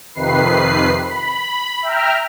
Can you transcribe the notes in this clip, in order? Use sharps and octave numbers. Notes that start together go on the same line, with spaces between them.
F2 C3 D#3 B4 C7
B5
E5 G5 A#5 F6